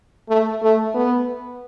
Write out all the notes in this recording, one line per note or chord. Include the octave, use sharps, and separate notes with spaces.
A3
A3
B3